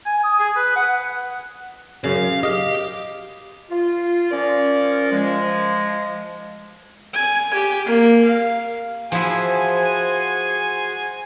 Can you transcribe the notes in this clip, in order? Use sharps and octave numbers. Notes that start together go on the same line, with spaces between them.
G#5
D#6
G#4
B4
F#5
F#2 C#3 F5
G4 D#5 F5
F4
F3 C#4 A#4 D5
F3 G#3
G#5
G4
A#3
F5
F3 E4 F#4 G#4 C5 G#5